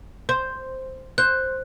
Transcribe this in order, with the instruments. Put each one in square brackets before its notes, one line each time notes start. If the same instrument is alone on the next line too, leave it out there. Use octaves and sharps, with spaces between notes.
[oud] C5
[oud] C5 [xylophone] F#6